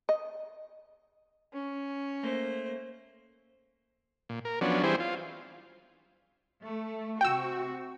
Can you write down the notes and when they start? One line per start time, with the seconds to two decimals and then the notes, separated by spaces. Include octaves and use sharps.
0.09 D#5
1.53 C#4
2.23 A3 A#3 C5
4.29 A#2
4.45 A#4
4.61 F3 F#3 B3 C#4 D4
4.83 E3 G3 C4 E4 G#4 C5
5.00 F4
6.64 A3
7.21 C3 F#4 G5 E6